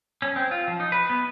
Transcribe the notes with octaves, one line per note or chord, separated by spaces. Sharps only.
C#4
C4
F4
F3
D#4
B4
B3